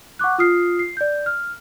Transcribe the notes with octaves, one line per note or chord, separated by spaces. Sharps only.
F#5 C#6 D6 F#6
F4 D#6 F6 C7
C7
D5 G6
F6